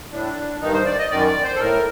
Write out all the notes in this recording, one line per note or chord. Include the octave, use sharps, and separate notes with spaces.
A2 D4
G2 D#3 D#4
C5
D5
D#5
F#2 D#3 D5
D5
C5
A4
A2 A#4